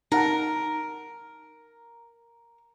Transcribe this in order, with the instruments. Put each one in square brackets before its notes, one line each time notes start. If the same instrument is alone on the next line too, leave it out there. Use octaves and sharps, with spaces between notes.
[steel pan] D#4 F#5 A5 [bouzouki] A#4